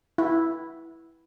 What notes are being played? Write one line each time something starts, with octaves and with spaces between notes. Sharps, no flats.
E4